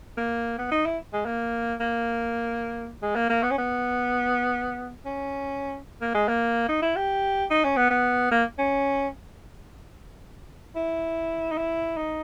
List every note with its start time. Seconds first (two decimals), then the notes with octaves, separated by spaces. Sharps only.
0.17 A#3
0.59 B3
0.71 D#4
0.86 E4
1.13 G#3
1.26 A#3
1.80 A#3
3.02 G#3
3.15 A#3
3.30 A#3
3.43 B3
3.51 C#4
3.58 B3
5.06 C#4
6.01 A#3
6.14 G#3
6.28 A#3
6.69 D#4
6.82 E4
6.96 G4
7.51 D#4
7.64 C#4
7.77 B3
7.91 B3
8.31 A#3
8.59 C#4
10.76 E4
11.52 D#4
11.58 E4
11.97 D#4